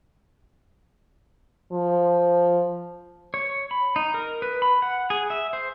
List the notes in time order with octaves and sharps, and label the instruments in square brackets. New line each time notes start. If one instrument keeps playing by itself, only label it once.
[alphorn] F3
[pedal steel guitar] C#5
B5
D#4
A#4
B4
B5
F#5
G#4
E5
C5